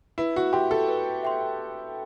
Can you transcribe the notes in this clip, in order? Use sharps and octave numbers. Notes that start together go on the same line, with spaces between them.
E4 B4
F#4
G4 E5 G5 C6
A4
B4
E5 G5 C6